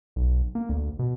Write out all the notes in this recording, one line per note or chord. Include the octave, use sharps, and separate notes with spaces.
B1
A#3
D2
B2